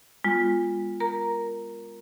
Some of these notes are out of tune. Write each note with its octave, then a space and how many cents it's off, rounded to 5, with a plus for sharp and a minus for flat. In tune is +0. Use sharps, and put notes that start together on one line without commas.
G#3 -30 B3 +0 F4 +0
A#4 +0 A#5 +0